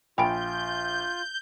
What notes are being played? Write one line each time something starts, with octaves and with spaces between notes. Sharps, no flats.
A#1 F4 G5 G#5 B5 G6 D7